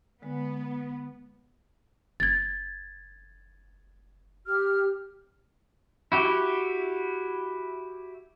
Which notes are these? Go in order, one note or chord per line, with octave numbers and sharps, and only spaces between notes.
D3 G#3 B3
F#1 G#6 A6
G4 F6
E4 F#4 G4